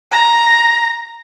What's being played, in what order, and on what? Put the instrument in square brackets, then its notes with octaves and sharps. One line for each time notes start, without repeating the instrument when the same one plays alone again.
[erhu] A#5